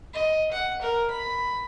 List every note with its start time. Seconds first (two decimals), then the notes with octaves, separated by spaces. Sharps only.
0.13 D#5
0.52 F#5
0.81 A#4
1.10 B5